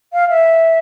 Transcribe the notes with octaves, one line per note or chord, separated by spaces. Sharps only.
F5
E5